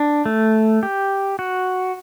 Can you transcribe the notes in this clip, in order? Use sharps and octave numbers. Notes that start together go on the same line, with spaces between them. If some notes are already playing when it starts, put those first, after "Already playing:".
Already playing: D4
A3
G4
F#4